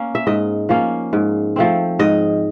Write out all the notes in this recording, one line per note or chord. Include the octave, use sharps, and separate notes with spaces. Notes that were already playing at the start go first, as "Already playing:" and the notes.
Already playing: A#3 C#4
E5
G#2 D#5
F3 A#3 C#4
G#2
F3 A3 C4
G#2 D#5